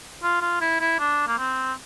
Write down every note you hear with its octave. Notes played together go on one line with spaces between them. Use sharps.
F4
F4
E4
E4
D4
A#3
C4